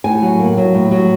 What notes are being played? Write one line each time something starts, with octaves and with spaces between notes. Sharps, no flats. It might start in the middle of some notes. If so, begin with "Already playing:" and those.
A2 G#5
F#3
A#3
F#3
A2
F#3